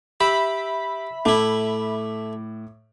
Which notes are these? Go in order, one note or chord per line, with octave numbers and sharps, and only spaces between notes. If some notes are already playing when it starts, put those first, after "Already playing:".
G4 E5 B5
A2 A3 E4 D6